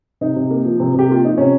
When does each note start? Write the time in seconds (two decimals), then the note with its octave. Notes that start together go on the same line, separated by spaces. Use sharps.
0.21 C3 D#4
0.36 C3
0.51 A#3
0.65 F3
0.80 C3
0.94 C3 G4
1.09 A#3 F4
1.24 F3 D#4
1.38 C3 C#4